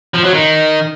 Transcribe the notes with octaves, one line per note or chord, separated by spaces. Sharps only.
F3
F#3
D#3